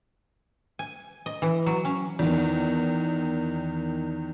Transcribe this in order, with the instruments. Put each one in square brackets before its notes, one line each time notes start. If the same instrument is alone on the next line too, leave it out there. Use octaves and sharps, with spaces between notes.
[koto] G#5
D#5
E3
F#3
C#4
[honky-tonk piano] E2 D#3